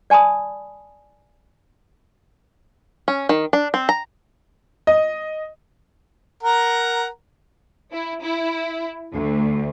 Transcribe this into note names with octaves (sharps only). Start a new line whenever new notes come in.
D5 G#5 A5 B5 D#6
C#4
D#3
D4
C4
A#5
D#5
A#4 F#5 A#5
E4
E4
D2